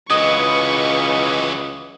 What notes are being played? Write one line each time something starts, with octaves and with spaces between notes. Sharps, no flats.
C#2 E3 F#3 B4 D#5 C#6